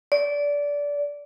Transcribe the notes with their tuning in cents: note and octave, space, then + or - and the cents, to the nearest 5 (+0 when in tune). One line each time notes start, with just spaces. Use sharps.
D5 -20